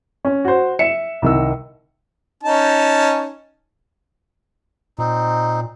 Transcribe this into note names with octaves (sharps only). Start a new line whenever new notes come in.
C#4
F#4 C5
E5 C#7 E7
C2 D#3 E6
C#4 D#4 A5
A#2 C4 D#4